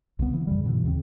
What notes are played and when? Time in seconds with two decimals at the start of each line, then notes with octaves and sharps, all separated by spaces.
0.19 C2 C#3 B3
0.34 E3
0.47 F#2 C#3 G3
0.65 G#2 B2 D3 E3
0.84 D#2 C#3 C4